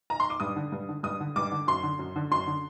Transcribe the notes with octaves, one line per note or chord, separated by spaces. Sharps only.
A#5
C6
D6
G2 D#6
D3
G2
D3
G2 D#6
D3
G2 D6
D3
F#2 C6
D3
F#2
D3
F#2 C6
D3